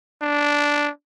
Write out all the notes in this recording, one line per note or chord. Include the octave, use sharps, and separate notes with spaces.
D4